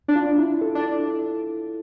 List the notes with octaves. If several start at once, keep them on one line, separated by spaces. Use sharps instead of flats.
D4
F4
E4
A4
D4